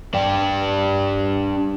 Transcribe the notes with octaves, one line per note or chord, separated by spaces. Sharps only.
D4 G4